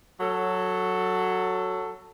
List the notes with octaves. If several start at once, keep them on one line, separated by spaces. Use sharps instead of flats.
F#3 A4